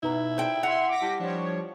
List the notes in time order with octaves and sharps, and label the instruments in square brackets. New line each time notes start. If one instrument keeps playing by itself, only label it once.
[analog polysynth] B2 [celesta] D#4 B4 A#5 [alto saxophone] E4
[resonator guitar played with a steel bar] C5 G5
[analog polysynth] E5 C6 [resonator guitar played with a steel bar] F#5 [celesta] F7
[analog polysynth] D6 A#6 B6
[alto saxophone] G3 [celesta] E4 A5
[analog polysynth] F3 G3 C#5 [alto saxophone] D4